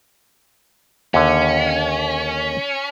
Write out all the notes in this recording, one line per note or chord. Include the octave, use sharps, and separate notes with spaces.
D#2 D3 C#4